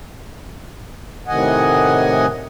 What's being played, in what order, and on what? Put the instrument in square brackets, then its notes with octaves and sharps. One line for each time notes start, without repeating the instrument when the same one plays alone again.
[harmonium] A2 C3 D#3 D#5 F#5 G#5